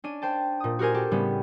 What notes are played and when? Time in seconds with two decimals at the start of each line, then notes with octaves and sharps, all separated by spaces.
0.04 C#4 D4 D#7
0.22 C5 G5 A5
0.60 A#2 D#6
0.79 F#4 G4 A#4 C5 G#5
0.94 G4 A4
1.11 A2 C#3 G3 B3 C#4